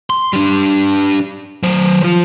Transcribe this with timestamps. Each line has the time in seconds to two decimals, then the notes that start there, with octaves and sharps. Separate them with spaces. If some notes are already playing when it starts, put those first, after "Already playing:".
0.10 C6
0.33 G3 D4
1.63 F#3 C5
2.03 F3 F4